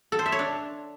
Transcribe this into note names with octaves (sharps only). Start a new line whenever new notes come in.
A4
C5
E5
C#5
D4